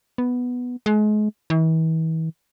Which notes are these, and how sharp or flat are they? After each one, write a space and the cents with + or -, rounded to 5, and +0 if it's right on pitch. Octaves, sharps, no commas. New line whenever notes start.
B3 +0
G#3 +35
E3 -40